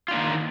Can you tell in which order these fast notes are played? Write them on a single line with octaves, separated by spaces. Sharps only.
F4 D4 A#3 D#3